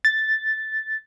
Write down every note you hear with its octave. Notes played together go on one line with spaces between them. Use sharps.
A6